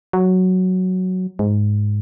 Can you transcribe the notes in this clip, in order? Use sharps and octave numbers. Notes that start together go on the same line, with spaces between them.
F#3
G#2